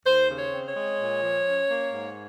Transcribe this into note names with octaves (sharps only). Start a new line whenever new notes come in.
D#2 C5
C#3
C#5
C4
C#5
G#3
A#2
F3
C#4
A#3
G#2